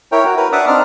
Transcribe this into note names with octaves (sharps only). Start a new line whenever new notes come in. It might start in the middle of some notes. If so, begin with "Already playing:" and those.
E4 A#4 C#5 G5
F#4
A#4 B4
D4 D5 E5 F#5 D6 D#6
C4 D4 D#4 D5 F6